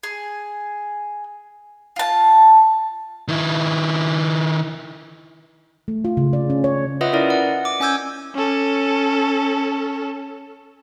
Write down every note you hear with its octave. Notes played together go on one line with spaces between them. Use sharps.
G#4
F4 A5
D#3 E4
A3
F4
C#3
D5
C#4
C#5
F4 B4 D#5 E5 F#5 D#6
C#4 E4 A#4 D5
F#5
D6
C#4 G#5 D6 E6 G6 G#6
C#4 A4